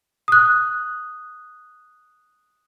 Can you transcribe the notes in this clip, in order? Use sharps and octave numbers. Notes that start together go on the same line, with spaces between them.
D#6 F#6